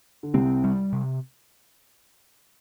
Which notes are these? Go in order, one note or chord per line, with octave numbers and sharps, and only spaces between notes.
D3
C2 C3 C4
G3
C3